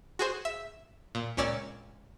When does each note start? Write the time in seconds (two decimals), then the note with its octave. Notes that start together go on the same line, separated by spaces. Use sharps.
0.19 F#4 G#4 C5
0.45 E5
1.15 A#2
1.37 C#2 A#2 C#4 D5 E6 A6